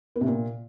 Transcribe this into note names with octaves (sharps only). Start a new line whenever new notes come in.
B3
C3
A#2